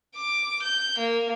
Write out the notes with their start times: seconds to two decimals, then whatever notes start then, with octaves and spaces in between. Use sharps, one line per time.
0.16 D6
0.63 G6
0.98 A#3